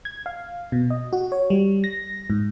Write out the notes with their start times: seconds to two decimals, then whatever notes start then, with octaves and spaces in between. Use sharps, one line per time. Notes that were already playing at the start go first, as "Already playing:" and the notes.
0.05 G#6
0.26 F5
0.72 B2
0.90 D#5
1.13 F#4
1.32 C#5
1.50 G3
1.84 A#6
2.30 G#2